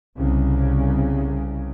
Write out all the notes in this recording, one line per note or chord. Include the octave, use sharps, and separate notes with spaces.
C2 C#3